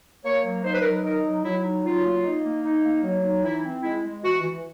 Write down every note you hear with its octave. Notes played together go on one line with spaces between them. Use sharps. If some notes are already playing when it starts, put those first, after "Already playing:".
A#3 C#5
F#3
D#4 C5
B4
A#4
F#3 B4
D#4 A#4
F#3
F#3 E4
D#4
F#3 F4
A#3
D#4
A#3
D#4
A#3
F#3
D#4
E3 E4
C4
G#3 E4
G#3
E3 F#4
E3